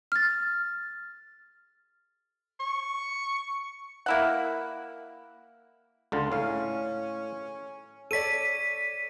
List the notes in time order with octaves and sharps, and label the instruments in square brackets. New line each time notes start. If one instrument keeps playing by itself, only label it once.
[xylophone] F6 A6
[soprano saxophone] C#6
[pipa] A#3 E4 F#5
[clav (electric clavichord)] C#2 D3 F4
[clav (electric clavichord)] A2 F5 [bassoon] C#4
[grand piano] A4 C#5 D5 [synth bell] B6 D#7